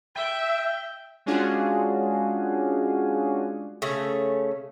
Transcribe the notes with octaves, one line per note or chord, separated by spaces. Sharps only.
E5 G5
G#3 C#4 D4 F4 F#4 G#4
C#3 A3 C#4